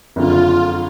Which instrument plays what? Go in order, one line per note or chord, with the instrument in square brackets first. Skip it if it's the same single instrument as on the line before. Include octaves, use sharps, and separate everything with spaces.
[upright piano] F#1 F2 D3 [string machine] F4